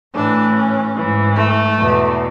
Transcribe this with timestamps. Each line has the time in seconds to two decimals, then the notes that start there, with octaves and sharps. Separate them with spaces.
0.14 A2 E3 D4
0.55 C#4
0.96 G#2 E3
1.37 A3
1.78 E2 B2